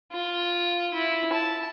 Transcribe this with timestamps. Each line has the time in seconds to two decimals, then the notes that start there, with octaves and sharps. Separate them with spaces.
0.12 F4
0.94 E4
1.33 A5